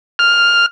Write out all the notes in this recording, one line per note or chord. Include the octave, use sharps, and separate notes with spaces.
F6